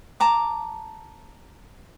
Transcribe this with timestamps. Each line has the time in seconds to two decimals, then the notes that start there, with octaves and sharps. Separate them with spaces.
0.20 A5 A#5 D6